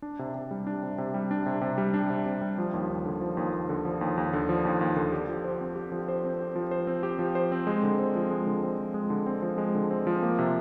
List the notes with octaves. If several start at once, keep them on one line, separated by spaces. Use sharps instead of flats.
D4
C3
C3
G3
D4
C3
C3
G3
D4
C3
C3
G3
D4
C3
C3
G3
F3
D#2
D#2
D3
F3
D#2
D#2
D3
F3
D#2
D#2
D3
F3
D#2
D#2
D3
G4
F3
C5
C4
G4
F3
C5
C4
G4
F3
C5
C4
G4
F3
C5
C4
G#3
D3
C4
F3
G#3
D3
C4
F3
G#3
D3
C4
F3
G#3
D3
C4
F3
A#3
C3